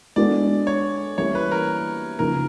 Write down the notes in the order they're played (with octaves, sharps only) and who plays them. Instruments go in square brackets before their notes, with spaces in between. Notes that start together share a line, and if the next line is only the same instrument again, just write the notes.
[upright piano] G#3 B3 D4 F#4 A4 [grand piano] D5
[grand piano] C#5
[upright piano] E3 G3 A#3 C#4 E4 [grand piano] C#5
[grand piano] B4
A#4
[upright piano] C#3 F3 A#3 D#4 [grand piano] A#4